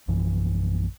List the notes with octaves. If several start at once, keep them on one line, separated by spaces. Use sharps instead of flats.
A#1 F#2 E3